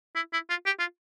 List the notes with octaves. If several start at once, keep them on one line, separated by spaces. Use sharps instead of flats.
E4
E4
F4
G4
F4